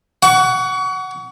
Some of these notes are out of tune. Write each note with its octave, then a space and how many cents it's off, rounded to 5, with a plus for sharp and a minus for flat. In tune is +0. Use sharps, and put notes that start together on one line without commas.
F#5 +10 C#6 +35